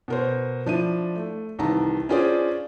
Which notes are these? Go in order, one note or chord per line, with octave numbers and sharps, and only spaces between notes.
B2 A#4 C5
F3 D4 E4 D#7
A3
C2 D#3 E3 A5 A#5
C#4 D4 F4 G#4 C5 D5